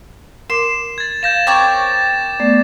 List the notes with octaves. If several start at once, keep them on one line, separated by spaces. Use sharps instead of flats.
A#4 C6 D6 E7
G#6 A6
F5 G6 A#6 E7
C4 A#4 C#5 D6 A6
A3 B3 D5